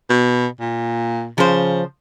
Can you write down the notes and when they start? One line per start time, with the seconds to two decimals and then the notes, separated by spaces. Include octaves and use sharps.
0.10 B2
0.60 A#2
1.38 C#3 F3 C5